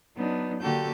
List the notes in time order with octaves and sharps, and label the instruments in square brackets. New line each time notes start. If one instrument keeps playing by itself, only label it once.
[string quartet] F#3 B3 D4 D#4
D3 A#3 F#4 G4 A4 G6